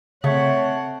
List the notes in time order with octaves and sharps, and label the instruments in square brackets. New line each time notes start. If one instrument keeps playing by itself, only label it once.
[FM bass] C#3 [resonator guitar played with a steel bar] A3 [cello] C4 F#5 [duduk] C#5